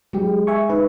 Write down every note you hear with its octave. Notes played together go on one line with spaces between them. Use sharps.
F#3 G#3 G4
E5 G#5 C#6
D#4 B4